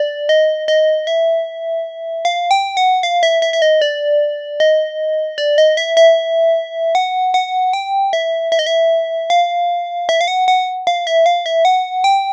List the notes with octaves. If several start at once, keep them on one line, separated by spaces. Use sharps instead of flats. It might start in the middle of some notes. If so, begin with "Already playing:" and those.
Already playing: D5
D#5
D#5
E5
F5
G5
F#5
F5
E5
E5
E5
D#5
D5
D#5
D5
D#5
E5
E5
F#5
F#5
G5
E5
E5
D#5
E5
F5
E5
F5
F#5
F#5
F5
E5
F5
E5
F#5
G5